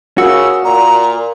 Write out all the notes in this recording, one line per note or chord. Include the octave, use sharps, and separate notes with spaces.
C#3 F#4 A#4 E6
A#2 A#5